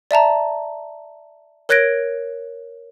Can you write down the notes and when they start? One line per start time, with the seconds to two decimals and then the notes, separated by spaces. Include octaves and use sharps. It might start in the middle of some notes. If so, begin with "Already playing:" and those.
0.11 D5 E5 A5 A#5
1.69 A#4 C#5 F#6 G#6 A#6 D7